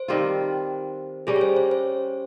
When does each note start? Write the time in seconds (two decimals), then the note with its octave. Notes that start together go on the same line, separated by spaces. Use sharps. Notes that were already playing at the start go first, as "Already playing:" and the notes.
Already playing: C5
0.08 D#3 G3 C4 F4
1.27 G3 C#4 G4 G#4
1.36 C#5
1.41 C5
1.56 C5
1.71 C5